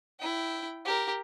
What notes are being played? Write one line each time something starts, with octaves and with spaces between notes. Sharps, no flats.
E4 G5
G4 A#4